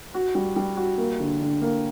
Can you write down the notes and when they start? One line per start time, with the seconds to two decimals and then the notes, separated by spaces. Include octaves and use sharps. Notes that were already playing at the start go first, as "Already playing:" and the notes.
0.14 F#4
0.35 G3
0.56 G3
0.77 F#4
0.98 A#3
1.20 D3
1.40 D3
1.62 A#3